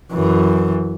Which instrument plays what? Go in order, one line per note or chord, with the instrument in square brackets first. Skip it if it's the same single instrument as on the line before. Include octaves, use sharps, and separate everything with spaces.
[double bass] F#2 E3